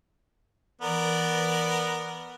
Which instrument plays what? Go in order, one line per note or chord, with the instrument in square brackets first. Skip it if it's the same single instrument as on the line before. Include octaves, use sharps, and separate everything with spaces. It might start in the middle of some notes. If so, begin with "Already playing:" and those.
[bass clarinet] E3 [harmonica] B3 A#4 D5